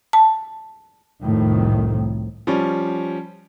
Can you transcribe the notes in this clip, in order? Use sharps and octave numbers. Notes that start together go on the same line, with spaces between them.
A5
C2 F2 A2 D#3
F3 G3 C#4